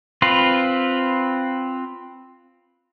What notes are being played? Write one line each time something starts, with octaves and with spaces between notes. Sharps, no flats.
C4 F4 B4